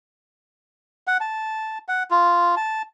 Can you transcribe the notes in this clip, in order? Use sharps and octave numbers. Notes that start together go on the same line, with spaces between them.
F#5
A5
F#5
F4
A5